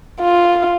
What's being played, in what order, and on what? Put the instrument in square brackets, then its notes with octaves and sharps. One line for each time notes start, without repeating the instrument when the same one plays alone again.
[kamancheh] F4